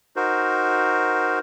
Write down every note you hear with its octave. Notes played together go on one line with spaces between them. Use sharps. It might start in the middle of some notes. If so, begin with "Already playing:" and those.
D#4 F#4 A#4 C5